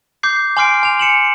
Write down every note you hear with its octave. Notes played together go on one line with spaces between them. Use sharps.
D6 G6 C7
G#5 C6 D6 F6 C7 D7
G#5 F7
C#7 E7 F#7